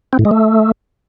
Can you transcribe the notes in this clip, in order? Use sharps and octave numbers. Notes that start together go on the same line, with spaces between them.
C4
A2
G#3
A3